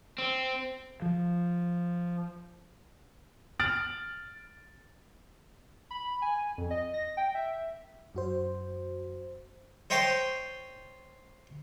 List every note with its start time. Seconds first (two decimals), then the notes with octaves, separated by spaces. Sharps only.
0.18 C4
1.02 F3
3.59 F6 A6 D7 F#7
5.91 B5
6.22 G#5
6.58 F2
6.71 D#5
6.94 A#6
7.17 G5
7.35 E5
8.15 F#2 F#4 C5
9.90 C5 C#5 D#5 G5 A5 C6